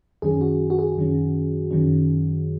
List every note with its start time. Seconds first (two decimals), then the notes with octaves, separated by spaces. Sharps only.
0.22 F#2 D#3 F#3 C#4 G#4
0.41 F#4
0.70 F#4
0.79 G#4
0.96 F#2 D#3 F#3 C#4
1.71 F#2 D#3 F#3 C#4